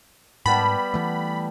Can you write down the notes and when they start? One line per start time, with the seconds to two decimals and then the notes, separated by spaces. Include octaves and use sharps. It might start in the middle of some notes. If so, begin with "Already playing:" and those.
0.46 G#2 G3 B3 A5 B5
0.94 E3 A3